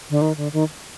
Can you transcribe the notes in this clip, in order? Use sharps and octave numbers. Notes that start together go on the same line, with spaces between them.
D3
D#3
D3
D#3